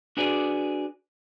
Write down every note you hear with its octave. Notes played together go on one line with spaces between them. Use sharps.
D4 F#4 G#4 B4 D5